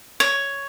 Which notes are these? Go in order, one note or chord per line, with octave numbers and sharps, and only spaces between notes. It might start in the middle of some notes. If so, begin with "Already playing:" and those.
C#5